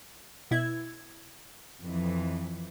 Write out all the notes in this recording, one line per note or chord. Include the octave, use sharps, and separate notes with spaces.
B2 E4 G#6
F2 E3